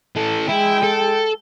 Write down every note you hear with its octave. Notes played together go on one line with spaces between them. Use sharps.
E3 A4
G#3 E4 G5
A4